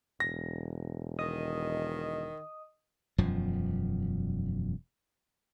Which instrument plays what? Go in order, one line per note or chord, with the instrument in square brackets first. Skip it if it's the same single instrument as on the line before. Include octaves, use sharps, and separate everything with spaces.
[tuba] E1 [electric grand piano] A#6
[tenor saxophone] D#3 [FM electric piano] D#5 D#6
[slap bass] E1 F#2 F3